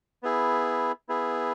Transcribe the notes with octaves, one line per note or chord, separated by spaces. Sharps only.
B3 E4 G#4
B3 E4 G#4